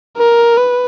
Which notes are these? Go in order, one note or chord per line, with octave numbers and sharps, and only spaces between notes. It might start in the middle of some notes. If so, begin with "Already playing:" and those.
A#4
B4